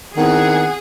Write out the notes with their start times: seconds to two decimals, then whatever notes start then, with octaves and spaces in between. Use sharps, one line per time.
0.17 D#3 B3 C4 E4 G#4 F#5